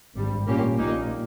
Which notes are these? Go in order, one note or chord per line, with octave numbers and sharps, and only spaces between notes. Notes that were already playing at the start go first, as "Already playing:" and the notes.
G#1 G2 G3
A#2 A#3 C#4 G4
A#1 A#2 A#3 D#4